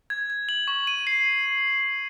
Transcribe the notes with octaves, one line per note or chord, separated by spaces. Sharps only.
G#6
G#6
F#7
C#6
D#7
C7